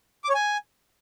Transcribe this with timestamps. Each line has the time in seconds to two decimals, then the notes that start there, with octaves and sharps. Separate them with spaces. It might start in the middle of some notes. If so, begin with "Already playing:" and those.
0.24 D6
0.29 C#5
0.34 G#5